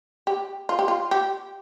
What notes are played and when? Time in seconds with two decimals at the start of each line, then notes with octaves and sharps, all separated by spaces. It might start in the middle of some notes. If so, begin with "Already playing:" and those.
0.27 G4
0.69 F4
0.79 G4
0.88 F4
1.11 G4